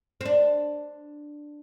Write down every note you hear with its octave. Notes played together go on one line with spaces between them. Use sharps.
C4
D4